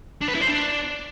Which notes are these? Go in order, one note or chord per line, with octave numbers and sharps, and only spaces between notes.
D4
B4
E4
C5
D4